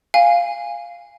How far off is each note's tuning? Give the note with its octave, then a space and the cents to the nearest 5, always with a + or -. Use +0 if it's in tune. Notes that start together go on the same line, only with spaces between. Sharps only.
F5 +0 G#5 -15